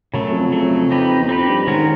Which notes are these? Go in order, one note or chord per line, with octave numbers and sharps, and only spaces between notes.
F#2 C#3 F#3 A3
F2
C#3 F#3 A3
C4 D#4 G4 B4
E2
F2 C4 D#4 G4 B4
G2
G#2 D#3 G#3 C#4 F#4 A#4